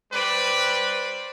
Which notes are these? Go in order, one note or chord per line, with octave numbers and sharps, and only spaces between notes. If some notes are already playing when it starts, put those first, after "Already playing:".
G3 B4 C5 D5